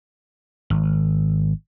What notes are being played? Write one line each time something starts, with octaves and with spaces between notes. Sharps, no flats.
G#1